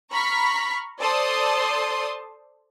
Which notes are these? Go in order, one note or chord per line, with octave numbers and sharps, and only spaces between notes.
A#5 B5 C#6 F6 B6
A4 C5 D5 A5 C6 D#6